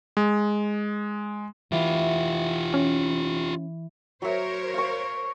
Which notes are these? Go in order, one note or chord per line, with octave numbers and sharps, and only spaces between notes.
G#3
E3 F4 G4
C#4
F#3 A#4 C5 C#5 E5
F5 C#6